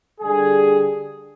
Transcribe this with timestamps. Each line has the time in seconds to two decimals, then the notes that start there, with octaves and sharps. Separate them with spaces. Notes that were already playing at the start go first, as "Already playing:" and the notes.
0.21 D3 G3 G#4